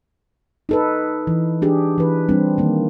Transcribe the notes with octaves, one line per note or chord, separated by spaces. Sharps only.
D#4 A4 B4
E3
D4 G4 G#4
E3 B4
G3 C4 D4
D#3 A#3